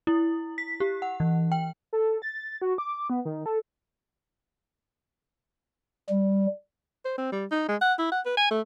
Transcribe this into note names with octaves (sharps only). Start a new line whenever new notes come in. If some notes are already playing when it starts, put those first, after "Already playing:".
E4
B6
G4
F#5
E3
G5
A4
A6
F#4
D6
B3
D#3
A4
G3
C5
C4
G3
D#4
G#3
F#5
E4
F#5
B4
G#5
A3